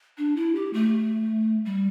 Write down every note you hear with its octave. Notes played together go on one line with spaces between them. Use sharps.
D4
E4
G4
A3
G3